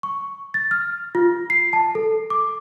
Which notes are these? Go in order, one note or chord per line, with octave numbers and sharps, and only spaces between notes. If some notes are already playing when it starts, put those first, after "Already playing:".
C#6
A6
F6
F4
C7
A5
A4
D6